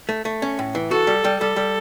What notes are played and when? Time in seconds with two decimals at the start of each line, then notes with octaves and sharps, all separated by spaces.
0.09 A3
0.25 A3
0.42 C#4
0.59 A2
0.75 E3
0.91 F#4 A4
1.07 G3
1.24 G3
1.40 G3 A4
1.56 G3